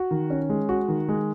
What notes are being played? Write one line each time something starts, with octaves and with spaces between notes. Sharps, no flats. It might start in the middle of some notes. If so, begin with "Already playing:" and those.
Already playing: F#4
D#3
C#4
G#3
F#4
D#3
G#3